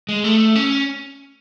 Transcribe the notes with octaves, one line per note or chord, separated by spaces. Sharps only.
G#3
A3
C#4